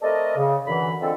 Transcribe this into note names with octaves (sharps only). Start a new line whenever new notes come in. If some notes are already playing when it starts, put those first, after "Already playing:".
A3 C4 A4 A#4 D5 D#5
C#3
F#2 D3 E3 B5
D3 F3 G#3 C4 A4